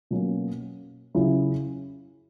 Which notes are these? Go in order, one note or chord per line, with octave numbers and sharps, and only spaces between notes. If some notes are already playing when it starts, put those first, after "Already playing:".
B2 F#3 A#3 C#4
C#3 F#3 C#4 E4 G#4